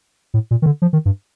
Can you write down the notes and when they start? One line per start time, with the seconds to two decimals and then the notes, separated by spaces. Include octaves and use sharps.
0.34 A2
0.51 A#2
0.62 D#3
0.66 D3
0.82 F3
0.93 D#3
1.05 G2